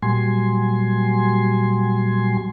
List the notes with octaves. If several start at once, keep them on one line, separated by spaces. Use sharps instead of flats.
A#2 F#3 G3 G#5 C6